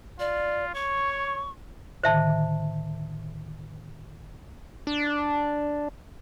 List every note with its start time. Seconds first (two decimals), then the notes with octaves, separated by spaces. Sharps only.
0.20 F4 D5
0.75 C#5 C#6
2.04 A2 D3 D#3 C5 E5 A5
4.87 D4